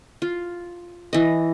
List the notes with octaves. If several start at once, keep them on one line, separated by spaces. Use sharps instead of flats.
F4
E3 D#5